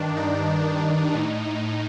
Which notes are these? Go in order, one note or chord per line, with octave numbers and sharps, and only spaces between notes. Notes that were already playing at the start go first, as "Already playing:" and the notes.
Already playing: G2 D#3 D4
D#4
A2